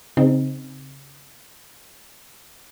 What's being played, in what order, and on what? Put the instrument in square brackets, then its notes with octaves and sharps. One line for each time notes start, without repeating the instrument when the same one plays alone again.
[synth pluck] C#3 C4 D#4